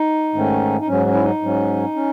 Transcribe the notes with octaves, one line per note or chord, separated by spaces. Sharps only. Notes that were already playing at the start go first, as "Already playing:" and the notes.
Already playing: D#4
G#2 D#3 A3 C#4
D#4
G#2 F#3 C#4
C#4
E4
D#4
G#2 F#3 C#4
C#4